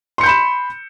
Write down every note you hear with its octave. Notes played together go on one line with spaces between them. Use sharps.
B5 C6 G6 C#7 E7